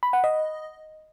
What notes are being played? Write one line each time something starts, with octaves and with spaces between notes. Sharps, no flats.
B5
F#5
D#5